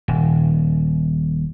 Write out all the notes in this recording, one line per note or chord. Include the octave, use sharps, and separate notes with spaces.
D#1